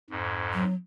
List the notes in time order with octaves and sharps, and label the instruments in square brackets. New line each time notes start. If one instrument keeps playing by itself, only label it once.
[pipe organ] F2 G#2
[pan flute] F#3